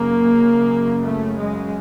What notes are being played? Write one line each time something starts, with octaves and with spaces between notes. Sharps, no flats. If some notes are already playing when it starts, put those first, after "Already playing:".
Already playing: F#2 C#3 A#3
A3
G#3